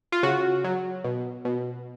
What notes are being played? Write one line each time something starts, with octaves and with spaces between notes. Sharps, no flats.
F4
C#3 F#4
F#3
B2
B2